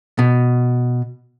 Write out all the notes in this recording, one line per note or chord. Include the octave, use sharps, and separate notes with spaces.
B2